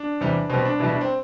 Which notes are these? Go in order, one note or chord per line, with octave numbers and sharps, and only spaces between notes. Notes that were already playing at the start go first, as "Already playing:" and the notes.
Already playing: D4
E2 C3 G3
B2 G3 C4
D4
B2 G3 E4
D4
C4